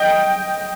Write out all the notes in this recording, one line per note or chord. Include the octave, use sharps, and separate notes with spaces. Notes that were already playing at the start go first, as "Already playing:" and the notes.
Already playing: D#5 G5